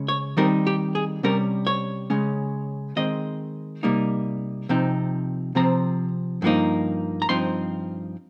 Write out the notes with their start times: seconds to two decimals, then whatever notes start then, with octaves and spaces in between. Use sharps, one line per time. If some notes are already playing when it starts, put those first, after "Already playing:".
Already playing: C#3 G#3 C#4
0.08 C#5
0.37 D#3 G3 C4 D#4 A#4
0.67 G4
0.95 G#4
1.23 C3 G3 C#4 A#4
1.67 C#5
2.10 C#3 G#3 C#4
2.96 D#3 G#3 C4 D#5
3.83 C3 G3 A#3 D#4
4.69 C3 F3 C4 D#4
5.55 C3 F3 C4 A#5
6.42 G2 F3 A#3 D#4
7.22 A#5
7.29 G2 F3 C4 D#4 C6